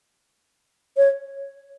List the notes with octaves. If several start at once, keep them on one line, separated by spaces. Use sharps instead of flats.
C#5